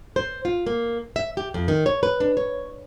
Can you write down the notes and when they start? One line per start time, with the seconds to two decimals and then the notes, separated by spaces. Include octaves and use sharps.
0.16 C5
0.45 F4
0.66 A#3
1.16 E5
1.37 G4
1.54 F2
1.68 D#3
1.86 C#5
2.03 B4
2.20 D4
2.37 C#5